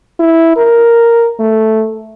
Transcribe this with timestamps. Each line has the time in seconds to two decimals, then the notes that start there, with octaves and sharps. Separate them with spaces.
0.20 E4
0.57 A#4
1.40 A3